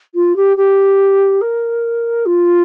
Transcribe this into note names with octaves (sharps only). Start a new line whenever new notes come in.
F4
G4
G4
A#4
F4